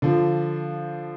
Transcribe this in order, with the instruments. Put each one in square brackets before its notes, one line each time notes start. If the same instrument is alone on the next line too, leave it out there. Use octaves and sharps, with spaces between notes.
[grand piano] D3 F3